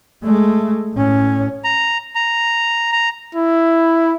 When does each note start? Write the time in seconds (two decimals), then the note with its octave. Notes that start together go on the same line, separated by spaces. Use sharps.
0.23 G#3 A3
0.94 A2 C#4
1.64 A#5
2.15 A#5
2.92 A#5
3.35 E4